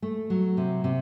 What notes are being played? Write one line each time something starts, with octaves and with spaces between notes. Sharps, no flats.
A3
F#3
C3
C3